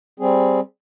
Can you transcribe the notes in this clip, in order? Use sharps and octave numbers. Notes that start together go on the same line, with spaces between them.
G3 C4 G#4